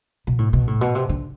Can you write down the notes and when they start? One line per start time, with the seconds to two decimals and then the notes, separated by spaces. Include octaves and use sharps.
0.27 B2
0.38 A2
0.53 B2
0.67 A2
0.81 B2
0.95 C3
1.09 D3